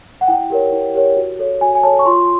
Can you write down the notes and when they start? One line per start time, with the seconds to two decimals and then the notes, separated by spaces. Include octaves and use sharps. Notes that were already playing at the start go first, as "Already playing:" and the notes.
0.21 F#5
0.28 E4 G5
0.50 G4 A#4 C#5
0.72 E4
0.94 G4 A#4 C#5
1.17 F#4
1.39 A4 C#5
1.61 F#4 G#5
1.75 G#5
1.83 A4 C#5 A5
1.99 C#6
2.06 F4 C6